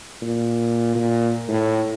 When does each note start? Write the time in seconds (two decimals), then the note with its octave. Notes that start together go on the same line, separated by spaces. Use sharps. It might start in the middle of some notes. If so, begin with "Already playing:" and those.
0.22 A#2
0.95 A#2
1.49 A2